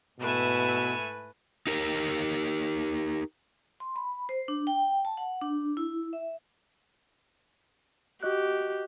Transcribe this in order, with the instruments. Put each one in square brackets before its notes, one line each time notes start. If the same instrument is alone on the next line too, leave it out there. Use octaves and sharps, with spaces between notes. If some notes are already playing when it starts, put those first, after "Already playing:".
[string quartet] G#2 E4 E6 [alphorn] B2 [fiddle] A3 G#5 [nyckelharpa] B4
[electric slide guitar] D#4 G4 A#4
[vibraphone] C6
B5
C5
D4
G5
A5
F#5
D4
E4
E5
[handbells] F#4 D#5 F#6 [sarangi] G4